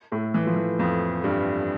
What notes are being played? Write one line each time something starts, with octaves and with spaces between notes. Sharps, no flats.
A2 A3
E3
F3
E3
F2 F3
G2 G3